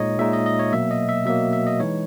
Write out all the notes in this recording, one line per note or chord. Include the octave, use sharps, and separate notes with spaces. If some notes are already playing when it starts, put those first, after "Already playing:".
Already playing: A#2 G#3 D#4 C#5 D#5
A#2 G#3 D#4 E5
D#5
D#5
C#5
B2 F#3 A#3 E5
D#5
E5
B2 F#3 A#3 E5
E5
D#5
E3 G#3 D#4 C#5